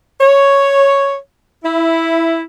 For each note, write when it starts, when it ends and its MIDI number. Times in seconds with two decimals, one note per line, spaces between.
0.21 1.16 73
1.64 2.43 64